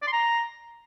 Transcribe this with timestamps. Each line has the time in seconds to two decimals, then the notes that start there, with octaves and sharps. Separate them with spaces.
0.02 D5
0.07 C6
0.12 A#5